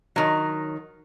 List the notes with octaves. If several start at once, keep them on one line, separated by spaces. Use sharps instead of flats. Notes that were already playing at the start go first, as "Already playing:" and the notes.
D#3 F#3